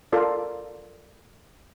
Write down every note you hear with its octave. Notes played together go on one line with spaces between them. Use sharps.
F4 A4 A#4 D5